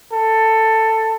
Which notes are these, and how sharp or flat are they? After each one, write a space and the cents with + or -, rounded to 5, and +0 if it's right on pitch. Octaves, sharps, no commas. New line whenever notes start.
A4 +15